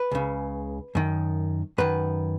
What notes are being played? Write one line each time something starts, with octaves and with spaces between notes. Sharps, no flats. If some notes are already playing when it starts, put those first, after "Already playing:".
Already playing: B4
C#2 C#3
F#2 D#3
F#2 D#3 B4